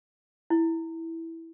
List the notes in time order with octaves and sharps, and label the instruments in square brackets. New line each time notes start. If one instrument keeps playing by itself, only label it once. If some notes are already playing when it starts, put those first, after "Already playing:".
[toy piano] E4